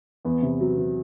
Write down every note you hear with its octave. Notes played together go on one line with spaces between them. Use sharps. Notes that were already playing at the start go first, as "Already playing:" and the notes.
E2 B3
C3
F#3
C3